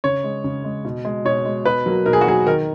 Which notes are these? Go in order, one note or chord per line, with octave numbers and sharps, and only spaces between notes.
C#3 C#5
G#3
C#3
G#3
B2
G#3
B2 C#5
G#3
B2 B4
F#3 A#3
B2 A#4
G#4
F#4
F#3 A#3 G#4
D#3 A#4